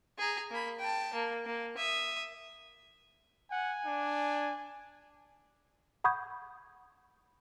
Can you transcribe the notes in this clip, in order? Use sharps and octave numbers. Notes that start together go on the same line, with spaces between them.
G#4 A#5
A#3 B5
G5 A5
A#3
A#3
E5 D#6
F#5 G#5
D4
F#5 B5 C#6 D#6 G6 G#6